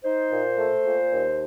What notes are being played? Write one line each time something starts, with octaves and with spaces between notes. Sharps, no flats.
D#4 C5
A#2
A3
A#2
D#2